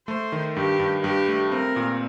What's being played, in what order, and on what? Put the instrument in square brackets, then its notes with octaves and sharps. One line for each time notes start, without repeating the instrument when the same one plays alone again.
[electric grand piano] A3 [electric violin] C5
[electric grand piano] D#3
[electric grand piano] G2 [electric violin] G4
[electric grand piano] G2
[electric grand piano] G2 [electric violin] G4
[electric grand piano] A3
[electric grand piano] C4 [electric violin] A#4
[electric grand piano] A#2